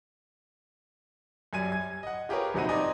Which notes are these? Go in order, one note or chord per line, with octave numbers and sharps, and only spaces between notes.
F#2 G3 G#5 G#6 D#7
G#6
D#5 F#5
F4 G4 G#4 A#4 B4 C#5
A#1 C3 D#4 F#4 D#7
C4 D#4 D5 D#5 G#5